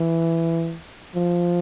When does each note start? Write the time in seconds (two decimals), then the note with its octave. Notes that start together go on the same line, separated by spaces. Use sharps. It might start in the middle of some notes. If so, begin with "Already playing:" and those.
Already playing: E3
1.15 F3